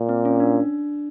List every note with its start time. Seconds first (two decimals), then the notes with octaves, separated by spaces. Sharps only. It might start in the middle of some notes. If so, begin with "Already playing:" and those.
Already playing: A#2
0.09 C4
0.25 C#4
0.40 D4